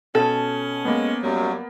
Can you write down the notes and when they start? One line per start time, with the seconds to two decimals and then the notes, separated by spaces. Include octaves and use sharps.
0.15 B2 C#4 A4
0.85 G#3 A#3 B3
1.23 F#2 F#3 G3